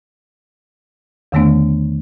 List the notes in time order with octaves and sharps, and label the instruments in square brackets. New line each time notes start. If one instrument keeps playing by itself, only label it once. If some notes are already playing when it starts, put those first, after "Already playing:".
[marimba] E2 D3 D#3 A3 B3 D4